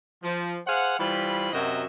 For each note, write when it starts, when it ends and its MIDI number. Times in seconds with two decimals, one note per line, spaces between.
0.23 0.59 53
0.67 0.98 68
0.67 0.98 72
0.67 0.98 77
0.67 0.98 78
1.00 1.50 52
1.00 1.50 55
1.00 1.50 65
1.00 1.50 72
1.00 1.50 83
1.53 1.85 42
1.53 1.85 48
1.53 1.85 66
1.53 1.85 70
1.53 1.85 75
1.53 1.85 76